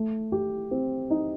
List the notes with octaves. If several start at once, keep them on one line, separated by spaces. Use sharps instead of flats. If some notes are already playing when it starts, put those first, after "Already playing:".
Already playing: A3
G4
C4
D#4